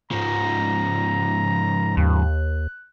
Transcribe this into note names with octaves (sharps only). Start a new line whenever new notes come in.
G#2 F3 A#5
D#2 F#6